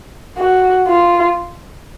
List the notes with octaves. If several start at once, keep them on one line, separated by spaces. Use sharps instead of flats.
F#4
F4